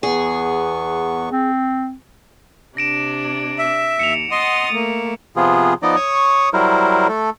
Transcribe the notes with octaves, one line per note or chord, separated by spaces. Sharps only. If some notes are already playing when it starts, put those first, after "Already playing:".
E2 B3 G#4 C#6
C4
C3 D4 A#6 D7 E7
E5
D#2 C#7 E7 F7
D#5 F#5 C6 D#6 A6
A3 A#3
C3 F3 B3 F4 G#4
F3 B3 D#4 D5 D#5
C#5 C#6 D#6
F#3 G3 E4 A#4 C5
A3 A4